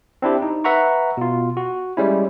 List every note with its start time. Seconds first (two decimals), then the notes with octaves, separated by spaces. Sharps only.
0.22 C4 D4 E4 G4
0.42 D#4
0.64 B4 E5 F#5 A#5 C#6
1.17 B2 F4
1.57 F#4
1.97 G3 G#3 C#4 E4